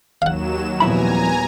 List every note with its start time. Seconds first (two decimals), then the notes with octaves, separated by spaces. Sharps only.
0.22 D#2 F#3 F5 F#5 E7
0.80 F2 A#2 G3 B3 E4 G#5 A#5 B5